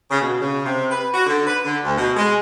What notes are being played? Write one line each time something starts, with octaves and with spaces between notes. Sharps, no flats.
C#3
B2
C#3
C3
B4
F#4
D3
B4
D3
D2
B2
G#3